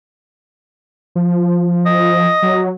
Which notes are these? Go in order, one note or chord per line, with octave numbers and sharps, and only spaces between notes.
F3
D#5
F#3